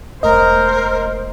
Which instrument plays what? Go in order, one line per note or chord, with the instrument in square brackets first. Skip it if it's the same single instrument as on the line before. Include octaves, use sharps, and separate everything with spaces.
[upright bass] E1 A3 [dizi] A#4 [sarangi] C5 [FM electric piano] D#5